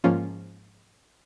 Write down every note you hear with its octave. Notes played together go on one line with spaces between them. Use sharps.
G#2 F3 A#3 C#4 F4